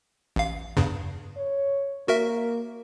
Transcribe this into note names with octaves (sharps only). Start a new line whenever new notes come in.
A1 F5
E2 G2 C#3
C#5
A#3 F#4 A#4 E5